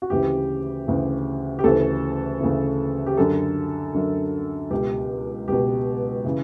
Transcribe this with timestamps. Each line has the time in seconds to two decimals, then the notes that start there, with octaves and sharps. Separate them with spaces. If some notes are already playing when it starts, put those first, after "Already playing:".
0.02 F#4
0.10 D2 C#3 E3 G4
0.87 D2 C#3 E3
1.59 G4
1.64 D2 C#3 E3 A4
2.40 D2 C#3 E3
3.06 G4
3.17 F#2 D3 A4
3.94 F#2 D3
4.71 C#2 B2 G4
5.48 C#2 B2 G4
6.25 C#3 E3